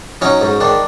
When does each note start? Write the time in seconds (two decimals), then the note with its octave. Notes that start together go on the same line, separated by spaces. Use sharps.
0.21 F#3 C#4 D#4
0.41 G#2
0.61 D#3 D4